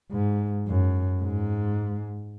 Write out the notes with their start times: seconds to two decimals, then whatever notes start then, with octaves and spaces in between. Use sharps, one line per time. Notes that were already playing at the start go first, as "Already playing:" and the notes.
0.12 G#2
0.68 F#2
1.23 G#2